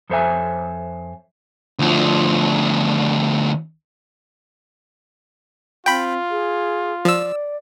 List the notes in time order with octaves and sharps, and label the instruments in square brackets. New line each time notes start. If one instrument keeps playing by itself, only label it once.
[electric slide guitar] F2 A4 C5 C#5 E5 G#5
[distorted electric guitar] D2 F3
[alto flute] C4 [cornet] F4 [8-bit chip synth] G5 B5
[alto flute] G#4
[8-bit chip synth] F3 E6 [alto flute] D5